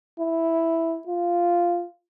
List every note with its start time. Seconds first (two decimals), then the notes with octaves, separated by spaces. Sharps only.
0.20 E4
1.07 F4